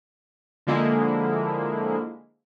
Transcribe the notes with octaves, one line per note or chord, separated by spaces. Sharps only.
D3 F3 G#3 A#3 E4